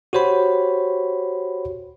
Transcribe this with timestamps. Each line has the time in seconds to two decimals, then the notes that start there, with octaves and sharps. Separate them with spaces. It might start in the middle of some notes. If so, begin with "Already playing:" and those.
0.13 F#4 G4 C5 C#5 B5